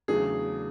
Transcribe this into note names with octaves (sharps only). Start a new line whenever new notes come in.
E2 C#3 F#3 A3 D4 G#4